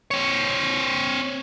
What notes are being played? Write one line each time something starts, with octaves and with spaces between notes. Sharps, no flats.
C4 C#5